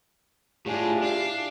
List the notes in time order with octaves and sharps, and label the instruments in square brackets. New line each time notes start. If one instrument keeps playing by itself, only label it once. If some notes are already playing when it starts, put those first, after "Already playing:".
[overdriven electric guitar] A2 [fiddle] D4 G#4 [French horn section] E4 F4 G4
[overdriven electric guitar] D4 [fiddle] F5